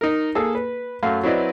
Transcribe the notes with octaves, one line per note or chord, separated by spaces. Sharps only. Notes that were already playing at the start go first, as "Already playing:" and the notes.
D#4 A#4
A#3 G#4 A4
B4
F#2 A3 F5
F#3 C4 E4 B4 D5 D#5